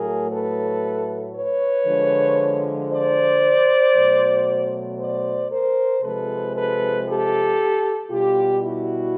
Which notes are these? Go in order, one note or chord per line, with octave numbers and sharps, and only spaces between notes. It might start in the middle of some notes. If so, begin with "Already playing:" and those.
Already playing: A2 F#3 A3 G#4 A#4
A4 B4
B4 C#5
D3 F3 G#3
C5 D5
B2 F#3 A3
C5 D5
A#4 C5
C3 F3 G#3 A4 B4
A4 B4
G4 A4
B2 G3 F4 G4
E4 F#4